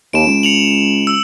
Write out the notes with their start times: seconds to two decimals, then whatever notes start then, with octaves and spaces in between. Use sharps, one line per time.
0.13 D#2 D7 E7
0.27 C#2
0.43 C#7 F7 F#7
1.07 E6